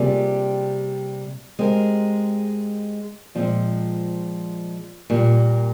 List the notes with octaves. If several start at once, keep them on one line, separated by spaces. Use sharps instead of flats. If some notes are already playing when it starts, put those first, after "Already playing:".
Already playing: C3 G3 A#3 F4 G#4
G#3 C4 G4 A#4
A#2 F3 G#3 C4
A#2 G3 A#3